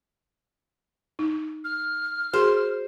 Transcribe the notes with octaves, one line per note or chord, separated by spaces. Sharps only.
D#4
F6
F#4 G#4 A#4 C5